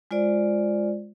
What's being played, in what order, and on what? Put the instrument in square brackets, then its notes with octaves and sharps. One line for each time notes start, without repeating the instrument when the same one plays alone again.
[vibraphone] G#3 F4 C5 D5